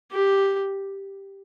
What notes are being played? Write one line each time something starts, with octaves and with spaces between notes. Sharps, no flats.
G4